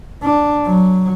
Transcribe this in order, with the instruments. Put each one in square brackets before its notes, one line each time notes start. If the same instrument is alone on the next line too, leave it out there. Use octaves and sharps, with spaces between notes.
[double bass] D4
F#3